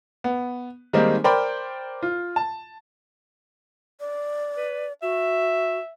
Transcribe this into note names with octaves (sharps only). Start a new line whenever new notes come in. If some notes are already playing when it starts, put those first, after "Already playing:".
B3
D#3 G3 G#3 A#3 C4 D#4
A#4 C5 D5 G5 B5
F4
A5
D5
B4
F#4 E5